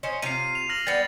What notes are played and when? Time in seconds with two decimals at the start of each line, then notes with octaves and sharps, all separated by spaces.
0.03 C#4 C5 D#5
0.22 C3 F4 F5 C7 D#7
0.55 F7
0.69 F6 A#6 F#7
0.87 G3 B3 A6